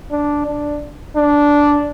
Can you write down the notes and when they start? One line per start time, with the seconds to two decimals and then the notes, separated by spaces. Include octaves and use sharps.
0.11 D4
0.46 D4
1.16 D4